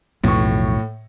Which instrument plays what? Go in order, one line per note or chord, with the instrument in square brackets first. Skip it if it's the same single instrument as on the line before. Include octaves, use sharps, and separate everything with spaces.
[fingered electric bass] B1 [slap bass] F2 E3 [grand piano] A2 C#6